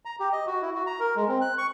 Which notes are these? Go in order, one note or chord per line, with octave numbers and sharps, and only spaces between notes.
A#5
G4
D#5
F#4
E4
F#4
A#5
A#4
G#3
C4
F#6
C#6